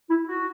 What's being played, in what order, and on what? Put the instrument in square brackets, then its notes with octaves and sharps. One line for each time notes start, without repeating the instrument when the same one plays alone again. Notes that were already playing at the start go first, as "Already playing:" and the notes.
[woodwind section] E4
F#4